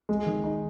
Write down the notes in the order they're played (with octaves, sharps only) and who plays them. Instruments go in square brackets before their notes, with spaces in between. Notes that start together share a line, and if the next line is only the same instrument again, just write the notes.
[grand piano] G#3
D#3
D#4